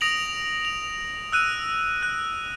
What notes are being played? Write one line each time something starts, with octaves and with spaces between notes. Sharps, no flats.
D#6 A#6 D7 F7 F#7
F7
E6 F#6 D#7
F#6